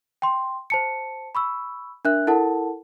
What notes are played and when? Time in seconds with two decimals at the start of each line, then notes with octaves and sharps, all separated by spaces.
0.22 G5 C6
0.70 C5 A5 C#7
1.35 B5 C#6 E6
2.05 D4 A#4 E5 F#6
2.27 E4 A4 A#4 F#5 A5